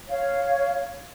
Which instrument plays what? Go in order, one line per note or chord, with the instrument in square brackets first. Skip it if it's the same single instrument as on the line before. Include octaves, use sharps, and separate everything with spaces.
[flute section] C#5 F5